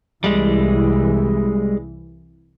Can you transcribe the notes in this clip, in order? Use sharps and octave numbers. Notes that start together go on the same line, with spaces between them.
C2 E3 G3 G#3